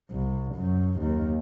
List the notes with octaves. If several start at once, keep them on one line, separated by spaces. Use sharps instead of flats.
C2
F#2
D#2